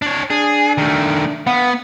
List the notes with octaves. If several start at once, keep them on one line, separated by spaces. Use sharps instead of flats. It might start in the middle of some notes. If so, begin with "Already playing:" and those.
D4 C#5
D4 G#4
D#3 A3
B3 B4 F5 F#5